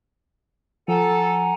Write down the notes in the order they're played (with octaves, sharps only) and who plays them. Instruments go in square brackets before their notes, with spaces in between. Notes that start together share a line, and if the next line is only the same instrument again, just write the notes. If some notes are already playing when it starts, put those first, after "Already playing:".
[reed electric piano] F3 [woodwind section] A4 [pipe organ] F#5 G#5 A#5